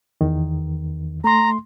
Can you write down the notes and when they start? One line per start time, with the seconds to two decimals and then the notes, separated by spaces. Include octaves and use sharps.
0.21 E2 D#3
1.24 A3 A#5 C6